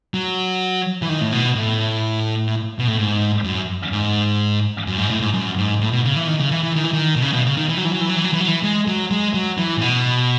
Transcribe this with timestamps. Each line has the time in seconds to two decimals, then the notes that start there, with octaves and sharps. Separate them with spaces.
0.14 F#3
1.02 E3
1.09 D#3
1.21 A2
1.32 B2
1.56 A2
2.79 B2
2.88 A2
2.98 G#2
3.44 F#2
3.92 G#2
4.87 F#2
4.98 G#2
5.10 A2
5.21 G#2
5.34 F#2
5.57 G#2
5.81 A2
5.92 B2
6.05 C#3
6.16 E3
6.27 D#3
6.39 C#3
6.51 E3
6.63 E3
6.75 D#3
6.84 E3
6.93 D#3
7.16 B2
7.22 C#3
7.33 B2
7.46 C#3
7.57 D#3
7.69 E3
7.77 F#3
7.85 E3
7.93 F#3
8.01 E3
8.09 F#3
8.16 E3
8.24 F#3
8.33 E3
8.40 F#3
8.48 E3
8.63 G#3
8.88 F#3
9.11 G#3
9.34 F#3
9.58 E3
9.77 A2
9.81 B2